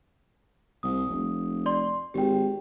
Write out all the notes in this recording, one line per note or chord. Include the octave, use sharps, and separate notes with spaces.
C2 D#6
F1
D5 C6
G#1 G4 G5